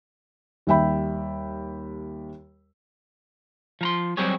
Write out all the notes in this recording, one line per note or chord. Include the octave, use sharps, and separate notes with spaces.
D#2 G3 E5 G5 B5
F3 A#5 C6
F#3 G3 C4 G4 G#4 C#5